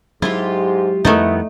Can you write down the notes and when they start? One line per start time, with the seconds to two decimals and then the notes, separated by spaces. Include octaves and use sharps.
0.22 G#2 F#3 G#3 E4 F4 G4
1.05 F2 D#3 E3 G3 A3 B3 D#4 E4